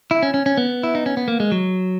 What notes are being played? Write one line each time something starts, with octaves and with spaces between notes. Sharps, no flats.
E4
C#4
C#4
C#4
B3
E4
D#4
C#4
B3
A#3
G#3
F#3